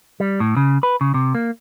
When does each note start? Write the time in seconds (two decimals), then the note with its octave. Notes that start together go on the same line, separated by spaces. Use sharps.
0.20 G3
0.40 A2
0.56 C#3
0.83 B4
1.01 C#3
1.14 C3
1.35 A#3